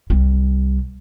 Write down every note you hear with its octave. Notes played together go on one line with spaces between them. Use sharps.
C2 G3